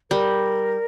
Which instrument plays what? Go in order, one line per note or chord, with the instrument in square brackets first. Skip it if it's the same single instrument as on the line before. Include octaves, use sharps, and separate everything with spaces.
[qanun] G3 [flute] A#4